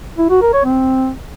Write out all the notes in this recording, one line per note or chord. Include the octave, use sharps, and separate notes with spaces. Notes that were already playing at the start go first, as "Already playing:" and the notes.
E4
F#4
A#4
C#5
C4